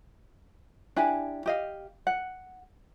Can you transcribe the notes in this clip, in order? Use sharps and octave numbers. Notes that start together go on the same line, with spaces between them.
D4 E4 G4 G#5
G4 D#5 F5
F#5